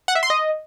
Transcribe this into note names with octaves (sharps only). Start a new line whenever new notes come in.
F#5
E5
C6
D#5